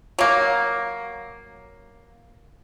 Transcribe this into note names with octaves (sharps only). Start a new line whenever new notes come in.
F#3 A#3